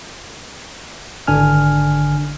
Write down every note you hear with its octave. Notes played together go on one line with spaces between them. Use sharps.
G#1 D3 D4 G#5 F6